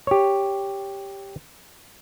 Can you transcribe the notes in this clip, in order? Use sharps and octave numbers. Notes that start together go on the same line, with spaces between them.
G4 C#5